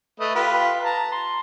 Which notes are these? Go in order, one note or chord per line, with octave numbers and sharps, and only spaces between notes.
A3 B4 D#5
F4 G4 B4
A5 A#5
C6